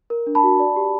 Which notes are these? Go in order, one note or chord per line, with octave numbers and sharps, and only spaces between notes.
A#4
D4
A5 B5
F#4
D5
G4